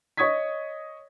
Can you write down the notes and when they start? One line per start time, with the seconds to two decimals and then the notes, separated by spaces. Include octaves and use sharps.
0.17 C#5 D#5 C#6 D#6 G#6 B6